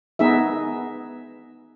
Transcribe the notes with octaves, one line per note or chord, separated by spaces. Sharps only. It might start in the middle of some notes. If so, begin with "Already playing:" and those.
B3 D#4 G#4 E5